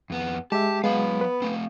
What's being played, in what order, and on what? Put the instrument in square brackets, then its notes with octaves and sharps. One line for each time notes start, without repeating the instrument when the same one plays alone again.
[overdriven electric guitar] F2 B3
[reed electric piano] G#3 E5 [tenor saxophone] G4 [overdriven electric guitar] A5
[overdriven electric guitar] F#3 F5 [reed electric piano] G#3 [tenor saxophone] B3
[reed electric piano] B4
[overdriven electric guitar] A3 C4